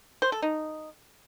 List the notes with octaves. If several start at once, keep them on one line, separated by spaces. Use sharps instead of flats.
C5
A4
D#4